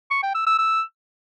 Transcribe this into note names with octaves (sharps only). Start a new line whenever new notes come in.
C#6
G5
E6
E6
E6